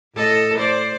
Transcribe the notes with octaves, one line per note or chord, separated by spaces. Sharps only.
A2 A4 D#5
C5 D5